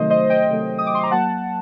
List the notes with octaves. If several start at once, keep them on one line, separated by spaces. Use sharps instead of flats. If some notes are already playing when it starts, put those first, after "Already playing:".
Already playing: C3 D#3 F#3 A3 C5 D#5
C5 D#5
D#5 G5
C3 D#3 F#3 A3
D#6
D6
C6
A#5
F#3 A#3 F#5 A5